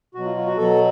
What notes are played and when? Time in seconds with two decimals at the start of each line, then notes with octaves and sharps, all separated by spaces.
0.14 B2 F#3 F#4
0.25 F4
0.37 F4
0.47 F#4
0.57 B2 F#3 A4